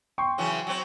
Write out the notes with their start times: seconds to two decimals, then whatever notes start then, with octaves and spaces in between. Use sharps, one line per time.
0.18 G5 C6 C#6
0.38 C#3 E3 F#3
0.67 F#3 C4